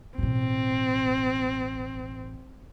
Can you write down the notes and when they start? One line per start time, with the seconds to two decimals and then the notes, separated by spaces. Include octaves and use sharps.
0.18 A1 B2 C4